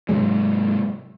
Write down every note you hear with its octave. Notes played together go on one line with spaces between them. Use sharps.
G#2 C3 F#3 G#3